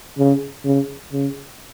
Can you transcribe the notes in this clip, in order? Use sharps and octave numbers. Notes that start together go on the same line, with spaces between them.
C#3
C#3
C#3